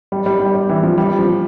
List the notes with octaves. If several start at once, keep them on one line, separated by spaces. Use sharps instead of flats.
G3
G3
G3
G3
E3
F3
G3
F3